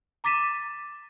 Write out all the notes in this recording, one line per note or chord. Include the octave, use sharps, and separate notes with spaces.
A#5 D6 A6 B6 D#7 E7